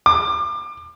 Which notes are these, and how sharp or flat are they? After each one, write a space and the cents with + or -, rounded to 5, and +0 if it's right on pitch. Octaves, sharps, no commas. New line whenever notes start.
D6 +30